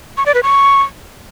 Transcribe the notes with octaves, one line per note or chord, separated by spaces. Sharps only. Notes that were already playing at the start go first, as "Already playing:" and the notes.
C#6
D5
B4
C#6